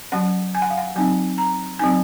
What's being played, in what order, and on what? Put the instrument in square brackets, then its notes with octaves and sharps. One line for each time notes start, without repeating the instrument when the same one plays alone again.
[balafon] F#3 C#4 F#5
G#5
F#5
F5
F#5
F#3 C4 D#4 G#5
A#5
F#3 C4 D#4 G#5